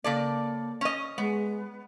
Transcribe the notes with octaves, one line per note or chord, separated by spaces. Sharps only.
C#3 A#3 A4 D5
C#4 D#5
G#3 B3